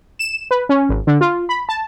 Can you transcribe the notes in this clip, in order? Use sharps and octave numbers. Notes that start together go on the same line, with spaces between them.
E7
B4
C#4
G#1
D3
F4
B5
A5